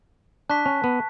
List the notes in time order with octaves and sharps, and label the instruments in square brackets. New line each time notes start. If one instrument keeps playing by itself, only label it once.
[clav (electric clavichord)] D4 [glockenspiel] A5 C#6 F#6 B6
[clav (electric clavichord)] C#4
B3